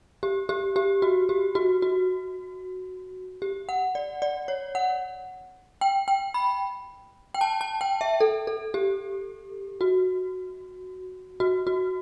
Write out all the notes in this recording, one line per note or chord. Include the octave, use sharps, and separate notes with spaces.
G4
G4
G4
F#4
G4
F#4
F#4
G4
F#5
D5
D5
C#5
F#5
G5
G5
B5
G5
A5
A5
G5
E5
A4
A4
G4
F#4
F#4
F#4